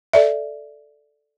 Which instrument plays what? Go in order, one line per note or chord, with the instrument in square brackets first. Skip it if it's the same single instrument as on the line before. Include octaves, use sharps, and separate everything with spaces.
[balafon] A4 D5 E5